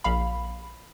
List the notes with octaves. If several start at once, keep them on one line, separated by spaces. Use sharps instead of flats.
A#1 F5 B5